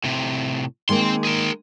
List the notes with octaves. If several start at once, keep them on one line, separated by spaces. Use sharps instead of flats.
A2 C3
D#3 G#3 A#3 C4 C6
G#4 A#4